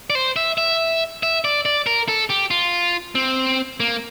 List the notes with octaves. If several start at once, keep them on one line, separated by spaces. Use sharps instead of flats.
D5
C5
E5
E5
E5
D5
D5
A#4
A4
G4
F4
C4
A#3